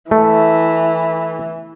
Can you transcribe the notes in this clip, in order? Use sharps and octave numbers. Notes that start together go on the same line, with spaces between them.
E3 A3